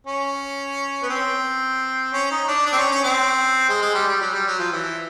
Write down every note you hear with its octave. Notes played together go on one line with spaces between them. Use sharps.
C#4
B3
C4
C#4
D#4
D4
D4
C4
C#4
C#4
C4
G#3
G#3
G3
G3
F#3
G3
F#3
F3
E3